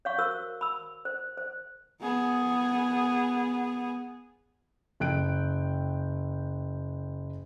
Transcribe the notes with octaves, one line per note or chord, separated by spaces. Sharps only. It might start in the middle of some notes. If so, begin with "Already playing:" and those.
C#5 F5 C#6
F#4 A#4 C5 E6
B5 E6
C5
C5
B3 G#4
F#1 G5 F#6 D7